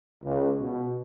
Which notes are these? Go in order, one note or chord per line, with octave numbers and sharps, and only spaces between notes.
C#2
B2